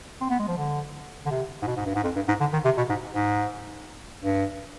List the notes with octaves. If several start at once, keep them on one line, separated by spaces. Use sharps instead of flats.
C4
B3
G#3
F3
D3
D3
C3
G#2
B2
G#2
G2
G#2
F2
G2
G#2
D3
D#3
C3
B2
G#2
G#2
G2